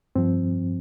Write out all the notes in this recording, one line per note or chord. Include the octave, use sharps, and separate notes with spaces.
G2 F3 C4